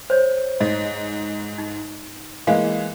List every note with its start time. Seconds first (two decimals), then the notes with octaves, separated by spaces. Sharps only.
0.10 C5 C#5
0.61 G#2 D#5
1.58 D#4
2.47 E3 G#3 A#3 F5